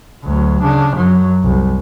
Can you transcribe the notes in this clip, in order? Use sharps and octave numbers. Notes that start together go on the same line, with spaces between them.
D2 F#3
C#3 D4
F#2 F#3
C2